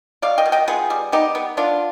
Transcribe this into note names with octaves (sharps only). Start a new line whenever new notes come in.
B2 D5 F5
D#5 G5
B2
D#5 G5
B3 F4 G#4
G3
B3 D#4 G4
B3
B3 D4 F4